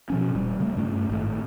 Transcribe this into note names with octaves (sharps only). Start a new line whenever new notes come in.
B2 F3 C#4
D#1 A#2 G3
C#3 G3 A3 A#3
G2 A3 C#4
G#1 A2